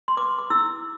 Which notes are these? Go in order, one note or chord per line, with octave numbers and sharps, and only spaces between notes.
C6
B4 D6
D6
E4 E6